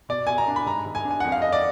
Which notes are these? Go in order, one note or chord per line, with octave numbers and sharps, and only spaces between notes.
B2 D5
B2 G#5
A#5
D4
B5
G#2 A#5
G#2
G#5
D4
G#5
F2 F#5
F5
F2 D#5
D5